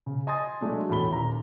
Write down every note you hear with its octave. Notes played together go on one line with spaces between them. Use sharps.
C#3
D#5 G#5 C6 D#6 A6
F#3 G#3 A3 D4
E2 A2 A4 B5 G7
D#1 D#2 A#5